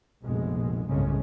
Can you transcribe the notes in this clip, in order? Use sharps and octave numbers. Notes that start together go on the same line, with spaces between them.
F1 A#1 B2 G#3
G1 C2 A2 C#3 G#3 C#4